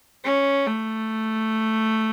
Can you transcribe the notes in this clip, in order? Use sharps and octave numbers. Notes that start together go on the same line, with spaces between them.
C#4
A3